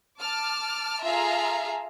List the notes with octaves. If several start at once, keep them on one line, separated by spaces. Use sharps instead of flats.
A5 D6 F6
F4 G#4 A4 E5 F5 A#5